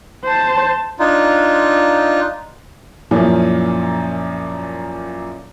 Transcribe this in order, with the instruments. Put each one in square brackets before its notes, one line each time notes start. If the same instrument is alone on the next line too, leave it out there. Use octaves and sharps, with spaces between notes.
[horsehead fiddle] C5 A5
[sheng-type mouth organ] D4 D#4 F4
[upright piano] F#2 A#2 F3 A#3 C#4 E4